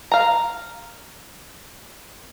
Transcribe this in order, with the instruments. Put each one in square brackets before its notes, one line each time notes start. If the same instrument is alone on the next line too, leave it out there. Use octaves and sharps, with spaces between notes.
[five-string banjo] F5 A#5